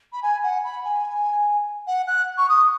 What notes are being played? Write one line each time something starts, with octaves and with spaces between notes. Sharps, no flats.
B5
G#5
F#5
B5
G#5
F#5
F#6
C#6
D#6